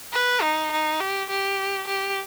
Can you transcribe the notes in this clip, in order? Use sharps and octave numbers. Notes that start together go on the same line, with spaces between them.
B4
D#4
D#4
G4
G4
G4